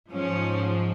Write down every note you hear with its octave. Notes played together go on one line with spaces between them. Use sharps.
G#2 F3 C#4